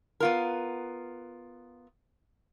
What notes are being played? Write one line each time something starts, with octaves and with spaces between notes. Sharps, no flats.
B3 F4 A#4